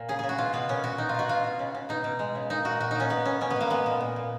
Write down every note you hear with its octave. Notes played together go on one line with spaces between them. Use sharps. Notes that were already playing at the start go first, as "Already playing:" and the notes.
Already playing: A#2
C#3 G#4
C#3 G#4
F#4
B2 F4
B2 B3
A#2 C#4
A#2 F#4
B2 D#4
F4
B2 F#4
B2 F4
B2
C#3
C#3
B2 D#4
B2
G#3
C#3
A#2 D#4
A#2 F#4
A#2 F#4
A#2 D#4
C#4
A#2 B3
A#2 C#4
B2 C#4
B3
B2 A#3
G#3 B3
A#2
A#2
A#2